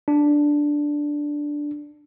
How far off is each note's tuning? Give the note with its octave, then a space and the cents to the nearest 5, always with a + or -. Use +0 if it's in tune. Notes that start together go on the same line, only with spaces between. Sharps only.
D4 +0